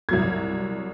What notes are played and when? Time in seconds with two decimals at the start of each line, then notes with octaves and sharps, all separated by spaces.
0.09 C2 F#3 G#6